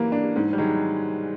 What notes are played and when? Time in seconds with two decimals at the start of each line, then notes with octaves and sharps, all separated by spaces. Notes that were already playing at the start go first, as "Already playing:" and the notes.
Already playing: E3 F#3 A#3
0.12 D4
0.36 G#2
0.53 G3
0.58 D#3 F#3 G#3